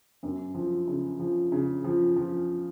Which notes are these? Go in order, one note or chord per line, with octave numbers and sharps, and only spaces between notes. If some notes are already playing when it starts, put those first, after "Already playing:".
F#2
F3
C#3
F3
C#3
F3
F3